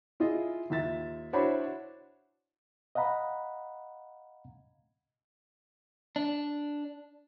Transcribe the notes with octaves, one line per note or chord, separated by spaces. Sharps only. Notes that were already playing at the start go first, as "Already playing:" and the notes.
E4 F4 G#4 D#5
D#2 F4 E5 A6
D4 E4 F#4 C5 C#5 B5
D#5 F5 F#5 A#5 B5
D4